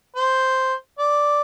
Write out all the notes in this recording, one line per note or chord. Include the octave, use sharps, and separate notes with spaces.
C5
D5